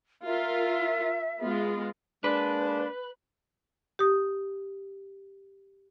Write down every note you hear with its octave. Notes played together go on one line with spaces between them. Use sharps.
F4 A#4 E5
G#3 B3 F4
G#3 A#3 D4 B4
G4 D#6